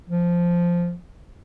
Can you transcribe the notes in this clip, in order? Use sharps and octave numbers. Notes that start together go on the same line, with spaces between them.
F3